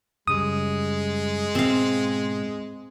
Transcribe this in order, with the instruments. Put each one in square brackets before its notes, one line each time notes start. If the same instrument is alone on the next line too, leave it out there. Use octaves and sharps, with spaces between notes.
[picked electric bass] F#2 C#3 G3 [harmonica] G#3 [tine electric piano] D#6
[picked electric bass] G#2 B2 [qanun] C4 F5